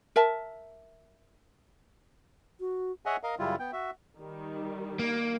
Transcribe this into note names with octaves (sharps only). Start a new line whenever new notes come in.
A#4 E5 A5
F#4
G#4 C#5 D#5 E5 F#5 G#5
A#4 D#5 F5
F#2 C#3 G3 E4 F4
B3 G5
F#4 E5
D#3 G3
A#3